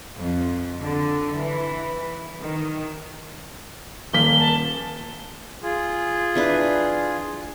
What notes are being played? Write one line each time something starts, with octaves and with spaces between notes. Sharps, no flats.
F2
D3
E3
D#3
D#1 A#3 B6 G7
A5
F4 G#4
E3 D4 B4